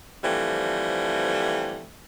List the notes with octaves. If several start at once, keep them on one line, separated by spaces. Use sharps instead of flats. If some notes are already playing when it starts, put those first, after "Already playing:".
D3 E3 F3 G3 A3 C4